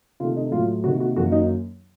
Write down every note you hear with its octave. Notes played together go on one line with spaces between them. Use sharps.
C3 D#3 A3 F4
D#4
A2 F#3 A3 F4
C3 D#3 A#3 F#4
F#4
F#2 D#3 F#3 A#3 F#4
D#4